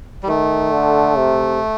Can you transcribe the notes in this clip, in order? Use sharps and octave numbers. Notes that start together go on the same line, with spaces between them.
G3
D#3 A3
D3
C3